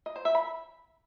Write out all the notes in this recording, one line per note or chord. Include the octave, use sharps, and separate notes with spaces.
D#5
C5
E5
B5